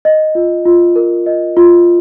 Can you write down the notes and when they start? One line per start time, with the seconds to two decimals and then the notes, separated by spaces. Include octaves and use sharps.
0.05 D#5
0.35 F4
0.66 F4
0.96 A#4
1.26 D#5
1.57 F4